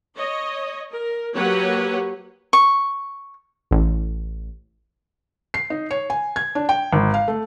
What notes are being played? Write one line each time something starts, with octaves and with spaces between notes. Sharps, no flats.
C#5 D#5
A#4
F#3 A#3 G4 B4 C#5 F#5
C#6
A1
C7
D#4
C#5
G#5
G#6
D4
G5
G#1
F5
A3